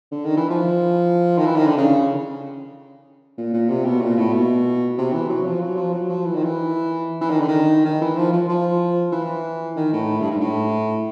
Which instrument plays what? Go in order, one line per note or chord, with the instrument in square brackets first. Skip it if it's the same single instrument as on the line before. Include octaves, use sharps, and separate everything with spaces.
[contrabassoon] D3
D#3
E3
F3
D#3
E3
D#3
D3
C#3
A#2
A#2
C3
B2
A#2
A2
B2
C3
E3
F#3
F3
F#3
F3
F#3
F3
E3
D#3
E3
E3
D#3
D3
D#3
D#3
E3
F3
F3
F3
E3
D#3
A2
G2
G#2
A2